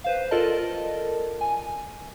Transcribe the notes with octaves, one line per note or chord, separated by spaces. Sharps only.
B4 C5 F5
F4 A4 A#4 D5 D#5 A5
G#5